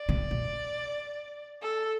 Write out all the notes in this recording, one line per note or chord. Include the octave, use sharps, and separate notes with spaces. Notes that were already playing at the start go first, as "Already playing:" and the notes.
Already playing: D5
C3
B2
A4